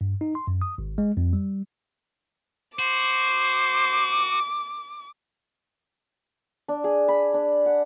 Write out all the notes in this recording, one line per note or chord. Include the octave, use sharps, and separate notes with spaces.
G2
D#4
C6
F#2
D#6
G#1
G#3
F2
G3
F#4 C5 D6
D4
G#4
B5
D4
F#5